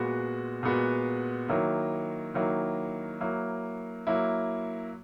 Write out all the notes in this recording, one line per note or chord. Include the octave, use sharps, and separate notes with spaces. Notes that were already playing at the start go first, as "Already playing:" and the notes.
Already playing: A#2 G#3 B3 F#4
A#2 G#3 B3 F#4
D#3 F#3 A#3 E4
D#3 F#3 A#3 E4
F#3 A#3 E4
F#3 A#3 E4